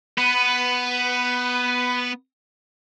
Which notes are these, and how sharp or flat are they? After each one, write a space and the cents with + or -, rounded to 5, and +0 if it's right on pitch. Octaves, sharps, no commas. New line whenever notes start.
B3 +0 B4 +15